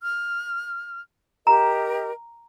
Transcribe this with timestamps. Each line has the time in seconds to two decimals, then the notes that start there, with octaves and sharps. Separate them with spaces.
0.02 F6
1.47 G4 A#4 D#5 A#5